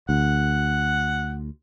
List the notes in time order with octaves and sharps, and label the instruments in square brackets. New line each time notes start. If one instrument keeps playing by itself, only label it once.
[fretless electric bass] D2 [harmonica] F#5